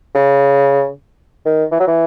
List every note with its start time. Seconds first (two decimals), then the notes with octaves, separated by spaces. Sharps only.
0.15 C#3
1.46 D#3
1.72 E3
1.80 F#3
1.88 E3